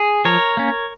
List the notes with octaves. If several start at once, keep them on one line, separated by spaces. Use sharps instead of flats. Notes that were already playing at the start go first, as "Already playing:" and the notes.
Already playing: G#4
F3 A#4 C#5
A#3 C#4